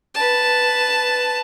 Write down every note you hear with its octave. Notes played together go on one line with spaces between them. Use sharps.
B4 A5